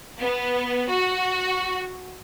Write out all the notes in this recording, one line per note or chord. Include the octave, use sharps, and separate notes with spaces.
B3
F#4